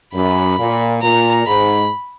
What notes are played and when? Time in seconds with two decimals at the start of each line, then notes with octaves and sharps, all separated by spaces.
0.14 F#2 B5
0.58 A#2
1.02 A#2 A#5
1.47 G#2 B5